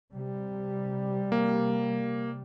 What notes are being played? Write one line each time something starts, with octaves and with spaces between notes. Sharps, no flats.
C3 G3
A#3